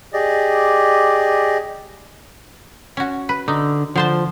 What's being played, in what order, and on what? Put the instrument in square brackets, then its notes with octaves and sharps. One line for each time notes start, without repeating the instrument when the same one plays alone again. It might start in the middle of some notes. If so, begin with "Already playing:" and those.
[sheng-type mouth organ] G4 G#4 D5 D#5
[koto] C#4 F#4
B4
[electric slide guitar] D3 [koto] D#4
[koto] D3 C5 A5 [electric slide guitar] F3